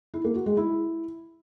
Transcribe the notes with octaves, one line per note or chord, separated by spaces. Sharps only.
E4
A#3
F#4
G#3
E4